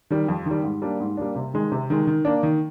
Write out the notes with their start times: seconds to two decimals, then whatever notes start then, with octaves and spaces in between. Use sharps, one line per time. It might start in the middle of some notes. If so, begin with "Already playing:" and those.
0.10 D#3 G3
0.28 F2
0.46 D#3 G3
0.64 G#2
0.82 G3 A#3 D4
1.00 G#2
1.17 G3 A#3 D4
1.35 C3
1.54 D#3 G#3
1.72 C3
1.90 D#3 G#3
2.07 D#3
2.25 A#3 D4
2.43 D#3